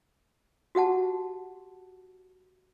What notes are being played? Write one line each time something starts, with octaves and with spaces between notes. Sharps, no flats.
F#4 G4 F#5 A5